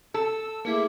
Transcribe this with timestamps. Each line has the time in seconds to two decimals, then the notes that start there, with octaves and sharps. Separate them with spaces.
0.14 A4 E6
0.65 A3 A#3 E4 G#4 D6